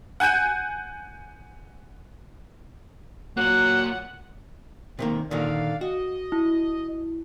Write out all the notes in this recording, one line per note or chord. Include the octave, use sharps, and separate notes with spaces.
F#5 G#5 F#6 G6 D#7
A#2 F#3 A#3 F#5 F#6
C3 D#3 A#3
A#2 D3 D#3 D5 F5
F#4 D#5
E4